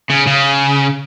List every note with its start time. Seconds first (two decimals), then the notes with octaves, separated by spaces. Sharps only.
0.10 C#3
0.27 C#3